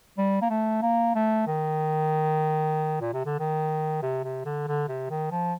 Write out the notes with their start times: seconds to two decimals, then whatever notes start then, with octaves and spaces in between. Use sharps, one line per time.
0.18 G3
0.42 A#3
0.50 A3
0.82 A#3
1.15 A3
1.47 D#3
3.01 A#2
3.13 C3
3.25 D3
3.39 D#3
4.03 C3
4.24 C3
4.45 D3
4.67 D3
4.88 C3
5.10 D#3
5.31 F3